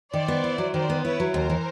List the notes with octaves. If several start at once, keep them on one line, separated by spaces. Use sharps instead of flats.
D#3 C5 D5
B3
E4
F#3
D#3 C5 D5
B3
E4 B4 C#5
F#3
D#2 A#4 C5
E3